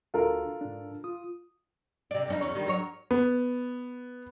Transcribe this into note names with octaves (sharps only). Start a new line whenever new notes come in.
D2 D4 F4 F#4 A4 A#4
G#2 D4
F4 D#6
C3 D5
G2 C#4 D#4
E2 C#4 C#5
D#3 G3
F#3 A#4 C#5
B3